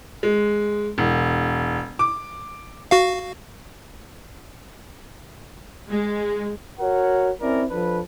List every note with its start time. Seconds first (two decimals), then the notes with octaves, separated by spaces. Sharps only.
0.23 G#3
0.98 E1
1.99 D6
2.91 F#4 F5
5.89 G#3
6.80 F#4 A#4 C#5 F#5
7.40 C4 C#4 E4 A#4 D5
7.69 F3 D4 A4 B4